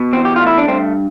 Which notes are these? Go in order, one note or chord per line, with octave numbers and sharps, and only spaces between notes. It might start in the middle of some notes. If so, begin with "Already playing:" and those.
Already playing: B2
E2 C4
G4
A3 F4
E4
D4
G2 C4